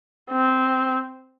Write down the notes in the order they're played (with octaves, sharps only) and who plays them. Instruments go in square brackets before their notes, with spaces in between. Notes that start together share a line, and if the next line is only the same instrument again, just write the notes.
[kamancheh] C4